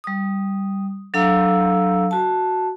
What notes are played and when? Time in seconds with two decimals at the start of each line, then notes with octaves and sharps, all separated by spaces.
0.04 G3 D#6
1.14 F#3 D4 A4 F5 A#5 E6
2.11 F#4 A5